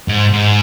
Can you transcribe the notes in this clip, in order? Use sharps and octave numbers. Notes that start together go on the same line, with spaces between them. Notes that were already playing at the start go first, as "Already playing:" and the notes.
G#2
G#2